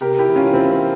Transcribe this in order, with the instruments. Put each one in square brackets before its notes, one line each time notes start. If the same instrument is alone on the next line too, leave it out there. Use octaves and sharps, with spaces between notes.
[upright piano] C3 G4 A#4
E4 G4
E3
C#4 F4
F4
E2 C4 E4
C4